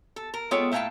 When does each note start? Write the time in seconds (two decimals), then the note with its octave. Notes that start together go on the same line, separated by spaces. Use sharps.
0.16 A4
0.34 A#4
0.51 G#3 B3 F4 A4 C#5 G5
0.72 A#2 A3 E4 F5 G5 A5